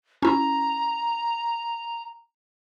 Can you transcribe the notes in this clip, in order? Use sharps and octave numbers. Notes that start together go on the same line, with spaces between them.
C#4 E4 A#5